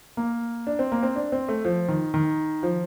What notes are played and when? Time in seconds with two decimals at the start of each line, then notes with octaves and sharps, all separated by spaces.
0.17 A#3
0.67 D4
0.79 C4
0.92 A#3
1.03 C4
1.16 D4
1.32 C4
1.48 A3
1.65 F3
1.88 D#3
2.14 D#3
2.63 F3